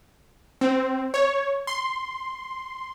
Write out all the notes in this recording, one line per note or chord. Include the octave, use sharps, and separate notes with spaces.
C4
C#5
C6